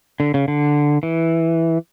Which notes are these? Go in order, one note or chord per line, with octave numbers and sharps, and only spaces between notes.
D3
C#3
D3
E3